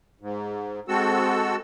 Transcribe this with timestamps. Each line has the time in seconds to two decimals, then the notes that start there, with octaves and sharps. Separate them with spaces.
0.20 G#2
0.88 G#3 C4 F#4 A4 E6